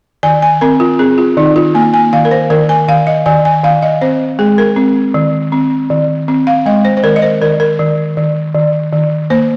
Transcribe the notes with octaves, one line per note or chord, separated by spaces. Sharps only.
D#3 G#5
G#5
C4 A#4
F4
C4 G#4
F4
D#3 D#4
F4
A#3 G#5
G#5
D#3 F5
A#4
C5
D#3 A#4
G#5
D#3 F5
D#5
D#3 G#5
G#5
D#3 F5
D#5
C4 C5
G#3 G#4
A#4
C4
D#3
C4
D#3
C4
F5
G#3 D#5
C5
C5
D#3 A#4
D#5
C5
D#3 A#4
A#4
D#3
D#3
D#3
D#3
A#3 C5